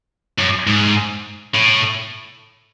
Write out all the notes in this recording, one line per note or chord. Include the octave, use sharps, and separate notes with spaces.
F#2
G#2
A2